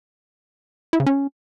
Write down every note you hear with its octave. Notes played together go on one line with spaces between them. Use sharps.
E4
C#3
C#4